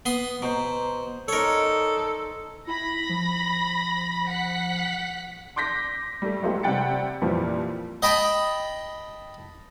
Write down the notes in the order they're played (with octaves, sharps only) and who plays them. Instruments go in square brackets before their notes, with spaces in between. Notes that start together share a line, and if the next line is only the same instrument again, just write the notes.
[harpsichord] B3 C6 D#6
[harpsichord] B2 [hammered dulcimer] C5 A#5
[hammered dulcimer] D#4 D5 [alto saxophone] A4 [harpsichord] A#4 C#5
[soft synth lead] E4 [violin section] B5 A#6
[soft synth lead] F3
[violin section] F#5 B6
[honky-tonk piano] C6 D6 G6 A#6 B6
G3 A3
F#3 G#3 A3 B3 F4 G4
C3 G3 F#5 G5 A6 C#7
F2 A#2 E3 F3 G3
[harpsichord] D#5 G5 A5 B5